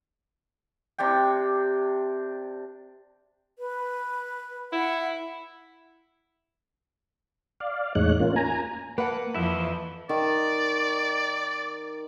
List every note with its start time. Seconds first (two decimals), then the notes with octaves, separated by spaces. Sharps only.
0.98 C3 D4 G4 G5
3.59 B4
4.72 E4 F#5
7.60 D5 F5
7.95 E2 A2 G#3 D#4 C#5 F#6
8.20 A#3 C#4 F4
8.36 G#5 A#5
8.98 A#3 B4 F#5 A5
9.35 F2 E3 F3 E4 E5
10.09 D#3 D5